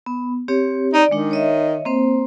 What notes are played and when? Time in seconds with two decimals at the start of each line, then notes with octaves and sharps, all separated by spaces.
0.06 B3
0.48 C4 G4 C#5
0.94 D#4 D5
1.11 D#3 G#3 D4
1.31 C#5 D#5 E5
1.85 A#3 C4 C5